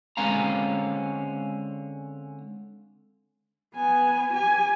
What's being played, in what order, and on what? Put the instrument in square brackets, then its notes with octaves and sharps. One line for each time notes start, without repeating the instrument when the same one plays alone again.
[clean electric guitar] D3 G#3 C4 C#4 F5 A#5
[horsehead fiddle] B3 G#5
G4 G#5